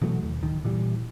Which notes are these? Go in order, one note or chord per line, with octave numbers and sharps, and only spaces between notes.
B2 E3 F#3 A3
D#2
D1 D#3
A#2 E3 G3